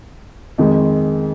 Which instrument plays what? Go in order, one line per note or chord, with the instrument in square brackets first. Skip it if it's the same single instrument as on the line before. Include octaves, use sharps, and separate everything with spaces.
[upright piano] F2 D#3 G#3